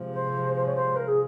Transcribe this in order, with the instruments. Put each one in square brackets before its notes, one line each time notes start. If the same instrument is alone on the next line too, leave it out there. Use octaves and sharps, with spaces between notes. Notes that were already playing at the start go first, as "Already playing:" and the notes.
Already playing: [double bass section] C3 F3 G#3
[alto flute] C5
C5
C#5
C5
A#4
G#4